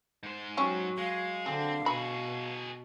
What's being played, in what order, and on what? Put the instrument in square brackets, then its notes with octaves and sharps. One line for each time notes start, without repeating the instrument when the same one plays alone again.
[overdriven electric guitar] G#2 C5
[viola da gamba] F#3 [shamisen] C#4 G4
[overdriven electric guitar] G#3 [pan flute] F5
[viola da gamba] D3 [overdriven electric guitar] C4 [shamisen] G#4
[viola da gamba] B2 [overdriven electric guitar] F#4 G#4 [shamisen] B5